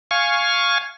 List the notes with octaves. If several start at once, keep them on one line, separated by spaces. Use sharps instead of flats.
F5 G#5 C#6